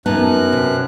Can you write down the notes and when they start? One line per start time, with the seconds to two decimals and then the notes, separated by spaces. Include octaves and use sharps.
0.06 F#2 B3 D#4 A5 F#6
0.52 C3